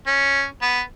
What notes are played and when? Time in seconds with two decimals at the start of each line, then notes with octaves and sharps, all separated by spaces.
0.07 C#4
0.62 B3